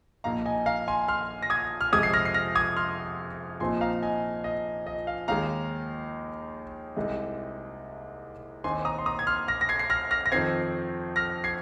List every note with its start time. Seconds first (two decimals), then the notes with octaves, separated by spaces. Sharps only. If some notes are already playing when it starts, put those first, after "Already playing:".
0.24 A#1 A#2 A#3 D#4 F5 A#5
0.45 D#5 G#5
0.66 F5 A#5
0.88 G#5 C6
1.08 C6 F6
1.43 A#6
1.50 D#6 G#6
1.81 F6
1.92 F2 C3 G#3 D#6 G#6
2.03 C7
2.13 F6 A#6
2.25 C7
2.34 F6 A#6
2.55 D#6 G#6
2.76 C6 F6
3.60 A#1 A#2 F3 C4 D#4 G#5 C6
3.81 F5 A#5
4.02 D#5 G#5
4.44 D#5
4.87 D#5
5.07 F5
5.28 D#2 D#3 G#3 D#4 F5 A#5
6.96 C2 C3 G#3 D#4
8.64 D#2 D#3 C4 D#4 G#5 C6
8.85 A#5 D#6
8.99 C6
9.06 A#5 D#6
9.19 G#6
9.27 C6 F6
9.48 F6 A#6
9.61 A#6
9.69 G#6 C7
9.79 C7
9.90 F6 A#6
10.11 F6 A#6
10.26 A#6
10.32 F2 D#3 C4 G#6 C7
11.16 F6 A#6
11.44 G#6 C7